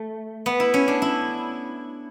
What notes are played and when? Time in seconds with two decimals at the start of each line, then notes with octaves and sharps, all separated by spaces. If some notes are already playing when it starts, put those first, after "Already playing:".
Already playing: A3
0.46 B3
0.60 E4
0.74 C#4
0.88 D4
1.02 E4